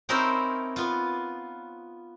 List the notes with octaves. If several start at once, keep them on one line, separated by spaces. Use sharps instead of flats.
C4 C#4 D#4 E4 A#4 C5
B3 F4